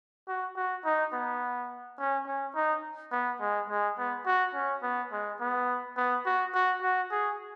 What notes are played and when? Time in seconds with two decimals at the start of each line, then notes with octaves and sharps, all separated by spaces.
0.28 F#4
0.56 F#4
0.85 D#4
1.13 B3
1.99 C#4
2.26 C#4
2.55 D#4
3.12 B3
3.40 G#3
3.69 G#3
3.98 B3
4.26 F#4
4.55 C#4
4.82 B3
5.12 G#3
5.41 B3
5.97 B3
6.26 F#4
6.54 F#4
6.82 F#4
7.11 G#4